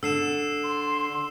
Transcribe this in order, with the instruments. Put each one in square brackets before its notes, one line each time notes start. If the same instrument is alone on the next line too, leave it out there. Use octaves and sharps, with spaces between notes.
[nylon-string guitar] D3 [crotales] E6 C7 E7
[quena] C6